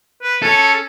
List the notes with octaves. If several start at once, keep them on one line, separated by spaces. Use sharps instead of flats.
B4
C#4 A4